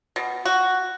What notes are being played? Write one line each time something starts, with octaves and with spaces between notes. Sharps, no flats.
B2
F#4